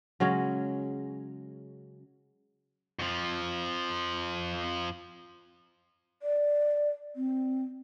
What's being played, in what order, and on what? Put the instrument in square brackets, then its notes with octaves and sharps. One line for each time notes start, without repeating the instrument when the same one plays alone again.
[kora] C#3 F#3 G#3 C#4
[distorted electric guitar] F2 F3
[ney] D5
C4